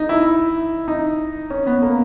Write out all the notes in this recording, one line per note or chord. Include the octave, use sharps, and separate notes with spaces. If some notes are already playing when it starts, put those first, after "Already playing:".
Already playing: D#4
E4
D#4
C#4
B3
A#3